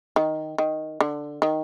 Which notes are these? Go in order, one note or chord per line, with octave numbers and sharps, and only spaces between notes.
D#3
D#3
D3
D#3